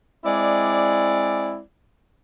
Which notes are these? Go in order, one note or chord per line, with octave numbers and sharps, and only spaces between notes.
G#3 C4 E4 D5